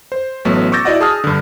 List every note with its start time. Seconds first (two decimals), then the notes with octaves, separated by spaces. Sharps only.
0.12 C5
0.45 A1 F#3 A3 B3
0.72 C#6 D6 E6 G6 A6 A#6
0.85 E4 F#4 D5 D#5 F#5
1.01 G#4 A5 D#6 F6
1.24 G2 D3